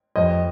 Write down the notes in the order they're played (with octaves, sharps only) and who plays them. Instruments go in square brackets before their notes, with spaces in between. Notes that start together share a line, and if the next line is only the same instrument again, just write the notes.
[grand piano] F2 D#5